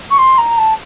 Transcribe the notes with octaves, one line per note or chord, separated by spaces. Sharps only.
C#6
C6
A#5
A5